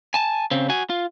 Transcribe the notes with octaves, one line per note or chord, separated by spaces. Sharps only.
G#5 A5
C#3 C4
F#4 G#5
F4